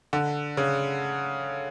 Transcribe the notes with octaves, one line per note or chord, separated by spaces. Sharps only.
D3
C#3